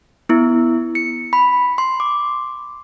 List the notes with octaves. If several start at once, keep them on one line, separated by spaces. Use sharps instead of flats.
B3 E4
C#7
B5
C6
D6